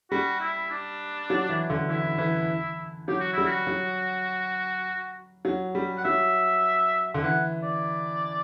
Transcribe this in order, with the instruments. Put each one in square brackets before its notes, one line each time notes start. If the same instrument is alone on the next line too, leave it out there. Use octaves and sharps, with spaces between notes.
[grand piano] G3 [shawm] F#4
[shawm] E4
D4
[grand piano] F#3
E3
D3
[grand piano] E3 [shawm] E4
[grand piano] E3
[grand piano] F#3 [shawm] G4
[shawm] F#4
[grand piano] G3 [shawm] E4
[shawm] F#4
[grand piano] F#3
F#3
G3
[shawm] F#5
[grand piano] F#3 [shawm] E5
[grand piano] D3
[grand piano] E3 [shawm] F#5
[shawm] D5